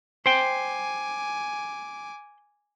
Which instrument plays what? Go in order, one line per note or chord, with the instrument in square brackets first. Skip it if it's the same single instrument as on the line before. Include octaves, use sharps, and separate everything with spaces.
[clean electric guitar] C5 G5 [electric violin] G#5 D6